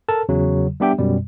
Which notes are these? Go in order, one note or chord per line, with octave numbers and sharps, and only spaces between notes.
A4 A#4 A5
E2 C#3 F#3
G3 B3 D4 G4 E5 G5
F#2 B2 G3